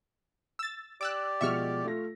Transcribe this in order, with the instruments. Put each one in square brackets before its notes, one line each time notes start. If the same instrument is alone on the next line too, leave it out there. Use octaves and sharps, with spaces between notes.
[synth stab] E6 A6
[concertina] G4 D5 [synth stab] D6 E6 F#6
[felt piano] B2 F3 G#3 [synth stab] E5 C#6 F6
[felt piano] A3 F4 A#6